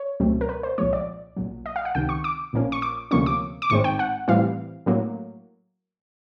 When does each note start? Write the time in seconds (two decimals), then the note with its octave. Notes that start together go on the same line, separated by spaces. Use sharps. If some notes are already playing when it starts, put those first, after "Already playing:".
Already playing: C#5
0.20 C#2 B2 F#3 A3 C4
0.41 A#4
0.49 B4
0.63 C5
0.78 C2 A#2 F3 G#3 C#5
0.93 D5
1.37 B1 A#2 F#3
1.66 D#5
1.76 F5
1.85 F#5
1.95 C#2 C3 D#3 G5
2.09 C#6
2.24 D6
2.53 A#1 A#2 F3 A#3 C#4
2.72 C#6
2.82 D6
3.11 D2 C3 F3 A#3 C#4 C#6
3.26 D6
3.62 D6
3.70 A1 G#2 D#3 G#3 C4 C#6
3.84 G5
3.99 F#5
4.28 A2 E3 G3 C4 F5
4.86 A2 F#3 A#3